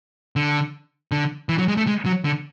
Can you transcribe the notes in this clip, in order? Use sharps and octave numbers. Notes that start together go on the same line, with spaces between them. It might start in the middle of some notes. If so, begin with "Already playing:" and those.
D3
D3
E3
F#3
G#3
A3
G#3
F#3
D3